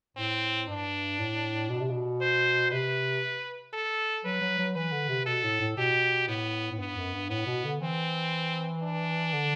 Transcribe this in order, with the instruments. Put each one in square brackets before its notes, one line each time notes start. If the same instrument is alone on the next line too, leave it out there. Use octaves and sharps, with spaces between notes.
[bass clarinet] A2 [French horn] C4
[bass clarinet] G2 [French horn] D4
[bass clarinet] A2
B2
C3
B2
[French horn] C5
[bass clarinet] C3 [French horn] B4
[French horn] A4
[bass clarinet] F#3 [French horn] B4
[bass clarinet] F#3
F#3
[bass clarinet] E3 [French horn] B4
[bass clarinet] D3
C3
[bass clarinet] B2 [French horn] A4
[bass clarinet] A2
A2
[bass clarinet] B2 [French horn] G4
[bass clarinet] A2 [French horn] B3
[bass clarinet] A2
[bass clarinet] G2 [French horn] B3
[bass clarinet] F#2
G2
[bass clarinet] A2 [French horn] B3
[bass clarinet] B2
D3
[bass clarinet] E3 [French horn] C4
[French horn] D4
[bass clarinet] D3